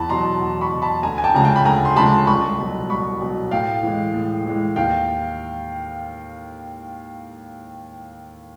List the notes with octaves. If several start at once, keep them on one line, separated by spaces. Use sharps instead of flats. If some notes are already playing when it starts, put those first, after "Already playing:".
Already playing: E2 A5 B5
B2 F#3 A#5 C6
E2
B5 C#6
B2 F#3
A5 B5
D2 G#5 A#5
G#5
G5 A5
C#3 F3 G#3 A#5
G5 A5
B5
D2 G#5 A#5
C6
C#3 F3 G#3 A5 B5
C2 B5 C#6
B2 F#3
C2 B5 C#6
B2 F#3
A2 F5 G5
E3 G#3
A2
E3 G#3
D#2 F5 G5